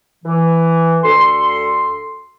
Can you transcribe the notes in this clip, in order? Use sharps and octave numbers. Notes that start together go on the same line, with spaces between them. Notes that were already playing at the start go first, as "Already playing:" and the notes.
E3
D2 A4 C6